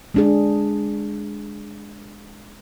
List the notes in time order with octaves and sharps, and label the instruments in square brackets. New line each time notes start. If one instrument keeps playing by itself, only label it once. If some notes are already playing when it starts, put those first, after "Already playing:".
[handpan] G#3 D4 G#4